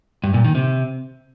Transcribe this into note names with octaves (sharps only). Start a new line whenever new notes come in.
G2
A#2
D#3
C3